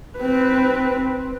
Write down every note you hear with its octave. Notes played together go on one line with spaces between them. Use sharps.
C4 B4